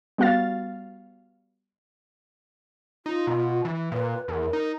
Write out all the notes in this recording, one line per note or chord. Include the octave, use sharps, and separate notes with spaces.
G3 B3 F#4 F5 F6 A6
D#4 F4
B2
E3
A#2 B4
E2 A#4
D#4